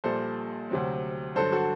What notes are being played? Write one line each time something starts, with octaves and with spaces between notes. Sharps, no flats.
A#1 A#2 G3 A4 C5
D2 C3 F#3 C4
G2 D3 F#3 A4 C5
F#4 A4